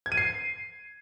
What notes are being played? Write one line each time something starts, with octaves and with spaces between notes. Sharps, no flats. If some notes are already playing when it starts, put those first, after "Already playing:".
G#6
D#7
C7